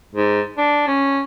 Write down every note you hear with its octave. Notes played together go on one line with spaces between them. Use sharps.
G#2
D4
C#4